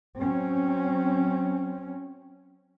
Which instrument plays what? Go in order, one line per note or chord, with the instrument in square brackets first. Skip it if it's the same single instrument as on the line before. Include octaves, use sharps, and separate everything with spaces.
[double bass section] F#3 C4 C#4